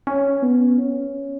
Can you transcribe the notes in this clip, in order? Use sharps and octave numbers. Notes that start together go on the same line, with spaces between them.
C#4
B3
C#4